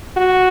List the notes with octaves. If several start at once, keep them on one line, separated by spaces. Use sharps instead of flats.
F#4